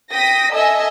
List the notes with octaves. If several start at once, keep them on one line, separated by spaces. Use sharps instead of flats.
G5 D#6 A#6 B6
A4 D#5 E5 G#5 E6